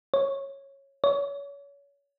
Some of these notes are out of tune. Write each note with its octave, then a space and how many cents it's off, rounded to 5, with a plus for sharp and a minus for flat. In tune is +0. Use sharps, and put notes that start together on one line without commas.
C#5 -15
C#5 +30